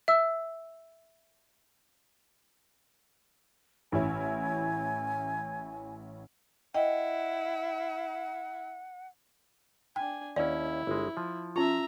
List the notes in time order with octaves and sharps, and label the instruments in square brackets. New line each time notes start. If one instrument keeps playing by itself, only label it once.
[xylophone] E5 E6
[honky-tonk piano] A1 C#4 E4 [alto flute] G#5
[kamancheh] E4 [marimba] D#5 G5 [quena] F#5
[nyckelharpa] D4 G#5 [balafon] G5
[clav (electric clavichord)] D#2 C#4 [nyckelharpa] E4 [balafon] D5
[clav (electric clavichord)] G1 G#3
F3
[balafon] C#4 F4 [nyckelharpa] E5 A#5